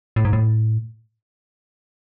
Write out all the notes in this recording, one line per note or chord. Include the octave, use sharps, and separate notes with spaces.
A2
G#2
A2